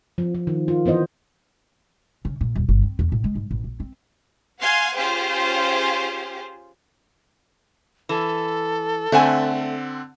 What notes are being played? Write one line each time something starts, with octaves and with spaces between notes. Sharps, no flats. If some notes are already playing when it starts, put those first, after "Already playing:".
F3
F3
D#3
F4
E3 B3 C5 D#5
C#3
A#2
D#1
G1
C4
E2
A2
G#3
G#2
A1
A#1
C4
F5 F#5 G#5 C6
C#4 F4 G4 G#4 C5 F5
E3 A4
D3 A3 C4 F#5 G#5